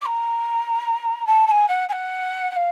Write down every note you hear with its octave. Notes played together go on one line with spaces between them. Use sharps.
D6
A#5
A5
A5
G#5
F#5
G#5
F#5
F#5
F5